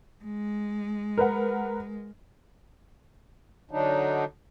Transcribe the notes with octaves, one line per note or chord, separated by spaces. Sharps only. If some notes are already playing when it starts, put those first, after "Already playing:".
G#3
A#4 B4 F#5
D3 F#3 D4 D#4